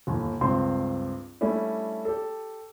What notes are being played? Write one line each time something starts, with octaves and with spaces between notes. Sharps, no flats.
G1 D#2
C#2 G2 C4 C6
G3 A3 C#4 D4 E4
G4 A4